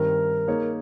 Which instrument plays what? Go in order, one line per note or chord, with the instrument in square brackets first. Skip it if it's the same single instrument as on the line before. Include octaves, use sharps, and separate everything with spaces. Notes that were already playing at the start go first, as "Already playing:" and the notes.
Already playing: [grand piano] G2 D#3 G3 C4 [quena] A#4
[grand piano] A#3 D#4 G#4 C#5